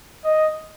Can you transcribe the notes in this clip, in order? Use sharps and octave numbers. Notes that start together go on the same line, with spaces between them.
D#5